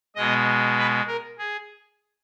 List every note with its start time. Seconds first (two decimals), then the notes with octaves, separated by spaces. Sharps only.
0.16 B2 G#3 D#5
0.78 B4
1.07 A#4
1.38 G#4